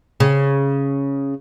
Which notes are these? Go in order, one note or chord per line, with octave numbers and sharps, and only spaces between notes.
C#3